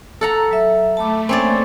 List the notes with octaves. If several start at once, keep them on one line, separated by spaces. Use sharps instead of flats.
A4 F#5 A#5
F#3 E5
A3 A5 B5 D6
A#3 C4 C#4 C#5 D5 G#5